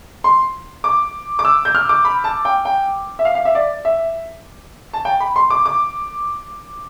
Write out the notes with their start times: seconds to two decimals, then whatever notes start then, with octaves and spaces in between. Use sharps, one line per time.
0.24 C6
0.84 D6
1.39 D6
1.45 E6
1.65 G6
1.75 F6
1.89 D6
2.05 B5
2.24 A5
2.45 G5
2.65 G5
3.19 E5
3.25 F5
3.35 F5
3.45 E5
3.55 D5
3.85 E5
4.93 A5
5.05 G5
5.20 B5
5.36 C6
5.50 D6
5.66 D6